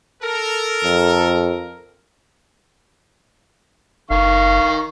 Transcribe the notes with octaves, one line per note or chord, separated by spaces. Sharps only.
A4 A#4
F2
F#1 D#3 F5 C#6